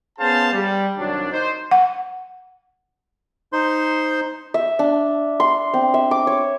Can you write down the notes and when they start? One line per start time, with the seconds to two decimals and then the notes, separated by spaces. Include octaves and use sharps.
0.19 B3 C#4 G#4 C5 F5 A5
0.52 G3
0.98 C2 D#3 F#3 D4
1.31 D#4 C5
1.71 F#5
3.53 D#4 C5 C6
4.54 E5
4.79 D4
5.40 C6
5.74 C4
5.94 E5
6.11 D6
6.27 C#5